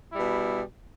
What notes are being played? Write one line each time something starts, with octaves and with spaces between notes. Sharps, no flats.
B2 G3 E4